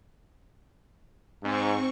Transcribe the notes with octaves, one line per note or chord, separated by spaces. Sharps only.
G#2 C4 C#6